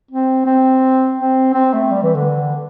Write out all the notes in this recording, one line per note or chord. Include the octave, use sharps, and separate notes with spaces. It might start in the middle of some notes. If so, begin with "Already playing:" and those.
C4
C4
C4
C4
A3
G3
E3
D3